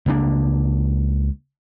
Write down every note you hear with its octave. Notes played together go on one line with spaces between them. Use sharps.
C#2 A#3 D4